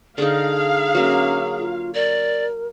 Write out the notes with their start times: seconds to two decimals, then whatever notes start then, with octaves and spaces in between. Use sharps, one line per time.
0.18 D3 D#4 G#4 F5
0.95 F#3 A#3 C#4
1.59 F4
1.95 A#4 D5